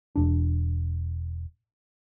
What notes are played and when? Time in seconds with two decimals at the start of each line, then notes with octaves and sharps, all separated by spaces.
0.16 E1 D4